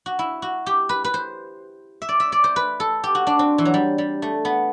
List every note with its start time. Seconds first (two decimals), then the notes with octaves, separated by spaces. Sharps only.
0.06 F#4
0.19 E4
0.42 F#4
0.66 G4
0.89 B4
1.04 B4
1.14 C5
2.02 E5
2.09 D5
2.20 E5
2.32 D5
2.44 C5
2.56 B4
2.80 A4
3.04 G4
3.15 F#4
3.27 D4
3.39 C4
3.58 E3
3.65 F#3
3.74 G3
3.98 G3
4.22 A3
4.45 B3